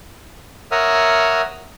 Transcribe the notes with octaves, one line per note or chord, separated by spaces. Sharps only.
A#4 C#5 E5 F#5 D#6 F6